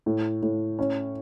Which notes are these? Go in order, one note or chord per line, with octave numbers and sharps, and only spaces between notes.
A2
A2
C#4